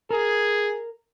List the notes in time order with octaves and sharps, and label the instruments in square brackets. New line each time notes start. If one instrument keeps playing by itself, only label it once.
[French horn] G#4 [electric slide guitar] A#4